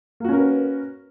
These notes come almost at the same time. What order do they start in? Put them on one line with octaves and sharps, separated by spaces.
A#3 F#4 C#4 A#4 B4